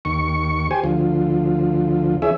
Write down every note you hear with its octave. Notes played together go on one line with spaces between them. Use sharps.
D#2 C#6
G4 C5 G#5
D2 F3
E3 C#4 G#4 E5